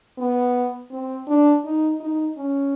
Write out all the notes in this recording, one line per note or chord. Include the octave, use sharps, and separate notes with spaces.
B3
C4
D4
D#4
D#4
C#4